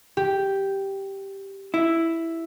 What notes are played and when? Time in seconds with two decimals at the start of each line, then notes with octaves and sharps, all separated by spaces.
0.17 G4
1.74 E4